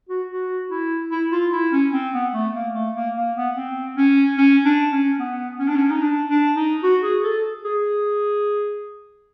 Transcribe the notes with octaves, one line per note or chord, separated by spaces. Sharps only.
F#4
F#4
E4
E4
F4
E4
C#4
C4
B3
A3
A#3
A3
A#3
A#3
B3
C4
C#4
C#4
D4
C#4
B3
C#4
D4
C#4
D#4
D4
D4
D#4
F#4
G#4
A4
G#4